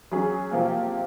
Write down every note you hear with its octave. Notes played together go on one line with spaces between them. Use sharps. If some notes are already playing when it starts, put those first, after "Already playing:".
F#3 C#4 G#4
C3 F3 A#3